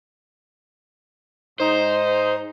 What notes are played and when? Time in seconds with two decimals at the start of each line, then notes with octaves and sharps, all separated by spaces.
1.60 G#2 D#4 C5